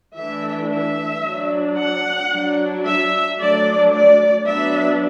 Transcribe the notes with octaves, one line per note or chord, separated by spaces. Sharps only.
E3 A3 D4 E5
E5
F#3 D4
F#5
F#3 D4
E5
F#3 A3 D4 D5
D5
F#3 B3 D4 E5